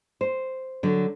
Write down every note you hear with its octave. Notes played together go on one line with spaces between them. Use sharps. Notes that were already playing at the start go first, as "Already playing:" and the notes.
C5
D3 F#3